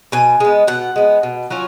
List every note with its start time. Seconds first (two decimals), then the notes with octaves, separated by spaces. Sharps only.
0.12 B2 G#5
0.40 G#3 B3
0.67 B2 F#5
0.96 G#3 B3
1.23 B2
1.50 F#3 C#4 F4